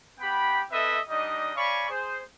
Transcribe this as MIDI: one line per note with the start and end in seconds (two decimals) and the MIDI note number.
0.19 0.61 59
0.19 0.61 67
0.19 0.61 79
0.19 0.61 83
0.71 0.98 60
0.71 0.98 69
0.71 0.98 71
0.71 0.98 75
0.71 0.98 76
1.09 1.51 55
1.09 1.51 62
1.09 1.51 63
1.09 1.51 75
1.55 1.86 73
1.55 1.86 74
1.55 1.86 77
1.55 1.86 80
1.55 1.86 83
1.55 1.86 85
1.89 2.21 68
1.89 2.21 72